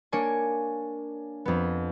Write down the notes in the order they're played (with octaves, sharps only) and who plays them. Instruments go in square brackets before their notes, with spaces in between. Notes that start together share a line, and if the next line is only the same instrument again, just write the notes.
[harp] A#3 D4 C#5 G#5
F2 B3